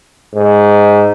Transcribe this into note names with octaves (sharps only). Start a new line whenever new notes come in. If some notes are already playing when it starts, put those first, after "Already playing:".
G#2